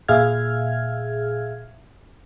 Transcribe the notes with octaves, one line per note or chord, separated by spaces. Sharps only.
A#2 G#4 E5 F5 F6 G#6